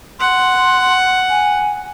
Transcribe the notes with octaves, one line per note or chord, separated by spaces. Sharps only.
F#5 C6
G#5